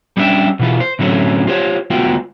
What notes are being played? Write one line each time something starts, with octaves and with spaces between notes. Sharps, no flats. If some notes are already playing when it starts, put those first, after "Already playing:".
G3 C#4 D4 F#4 E5 G5
B2 E3 F4
C5
A2 D3 F#3 A3 C4 C#4
F4 G4 C5 C#5
D2 G#3 B3 F4 F#4 G5